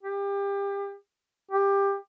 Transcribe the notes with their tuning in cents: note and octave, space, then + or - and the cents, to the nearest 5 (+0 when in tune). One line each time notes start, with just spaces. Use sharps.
G4 +30
G4 +20